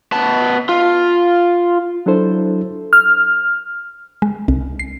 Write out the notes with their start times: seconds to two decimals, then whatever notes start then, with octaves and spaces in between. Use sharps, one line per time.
0.12 B3 A5
0.69 F4
2.06 F#3 D4 E4 A4 C5
2.93 F6
4.22 G#3
4.48 C2
4.79 C7